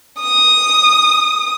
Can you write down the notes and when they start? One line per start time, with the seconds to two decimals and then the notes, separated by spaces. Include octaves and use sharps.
0.21 D#6